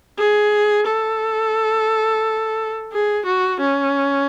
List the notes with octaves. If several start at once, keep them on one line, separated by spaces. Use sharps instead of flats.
G#4
A4
G#4
F#4
C#4